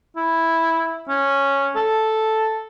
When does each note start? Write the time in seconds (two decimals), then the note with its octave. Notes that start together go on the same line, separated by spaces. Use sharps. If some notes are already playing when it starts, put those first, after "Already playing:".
0.17 E4
1.08 C#4
1.76 A4